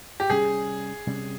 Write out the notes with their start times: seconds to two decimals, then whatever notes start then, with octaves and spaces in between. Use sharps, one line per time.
0.20 G4
0.29 C3 G3 C#4 G#4
1.07 C3 G3 C#4